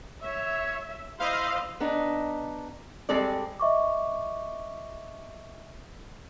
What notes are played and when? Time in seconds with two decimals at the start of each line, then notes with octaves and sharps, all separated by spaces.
0.23 C#5 E5
1.20 E4 C5 D#5 F5 C6
1.80 B3 D4 D#4
3.09 G3 G#3 C4 A4 D5
3.60 D#5 E5 C#6 D6